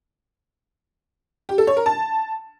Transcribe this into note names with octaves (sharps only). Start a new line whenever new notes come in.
G4
A4
C#5
A#4
A5